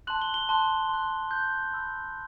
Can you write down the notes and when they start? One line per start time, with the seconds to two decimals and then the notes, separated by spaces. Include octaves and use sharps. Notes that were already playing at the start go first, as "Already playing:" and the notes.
0.07 A5 C6 F#6 F#7
0.22 G7
0.34 G7
0.49 A5 C6 F#6
0.89 C6 F#6
1.31 C6 F#6 G6
1.73 B5 E6 G6